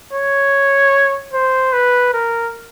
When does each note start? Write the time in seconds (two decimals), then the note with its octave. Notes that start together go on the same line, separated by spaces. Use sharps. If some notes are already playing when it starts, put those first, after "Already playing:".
0.13 C#5
1.33 C5
1.73 B4
2.13 A#4